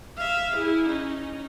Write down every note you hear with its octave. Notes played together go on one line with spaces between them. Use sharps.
E5 F5
E4 G#4
C#4 D#4